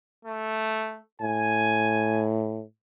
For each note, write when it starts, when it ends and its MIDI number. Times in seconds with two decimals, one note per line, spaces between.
0.25 0.98 57
1.21 2.63 45
1.21 2.25 80